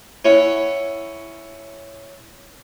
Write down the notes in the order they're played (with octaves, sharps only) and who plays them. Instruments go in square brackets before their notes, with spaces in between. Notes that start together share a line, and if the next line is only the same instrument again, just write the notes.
[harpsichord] C#4 E4 C#5 F#5